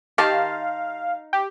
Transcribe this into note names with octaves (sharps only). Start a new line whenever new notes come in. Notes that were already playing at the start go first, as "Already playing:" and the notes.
D#3 D#4 G4 F5 A5 C6
G4